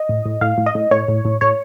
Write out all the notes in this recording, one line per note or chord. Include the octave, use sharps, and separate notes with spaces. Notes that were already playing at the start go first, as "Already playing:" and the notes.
Already playing: D#5
A2
A2
A2 F5
A2
D#5
A2
A2 C#5
A2
A2
A2 C#5